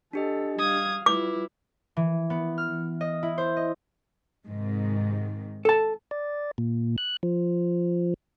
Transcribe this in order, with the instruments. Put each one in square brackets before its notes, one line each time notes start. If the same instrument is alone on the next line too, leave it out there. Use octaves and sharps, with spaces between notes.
[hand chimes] D4 G4 D#5 [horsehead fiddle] A4
[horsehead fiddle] G3 F5 [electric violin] D#6 G#6
[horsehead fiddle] G3 F4 [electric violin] E4 [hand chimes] B4 [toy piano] D6
[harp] E3
B3
F6
D#5
E4
C5
D#5
[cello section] G#2 C3 D#3
[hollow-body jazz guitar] A4 A5
[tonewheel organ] D5
A#2
F#6
F3